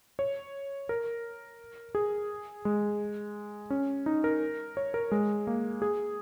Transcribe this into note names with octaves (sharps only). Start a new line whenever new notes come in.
C#5
A#4
G#4
G#3
C#4
D#4
A#4
C#5
A#4
G#3
A#3
G#4